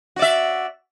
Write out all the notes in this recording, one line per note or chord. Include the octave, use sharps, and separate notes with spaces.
F#4 D5 E5